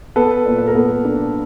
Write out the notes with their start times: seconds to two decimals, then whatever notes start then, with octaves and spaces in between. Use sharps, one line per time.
0.16 B3 A4 B4
0.46 A#2
0.58 B4
0.67 A#4
0.75 B3 A4
1.05 D4